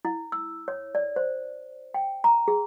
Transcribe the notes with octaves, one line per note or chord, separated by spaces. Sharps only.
E4
E6
C#5
D5
C5
G5
A#5
G#4